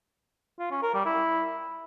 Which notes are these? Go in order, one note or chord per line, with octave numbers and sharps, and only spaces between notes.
F4
C#4
A#4
G3
E4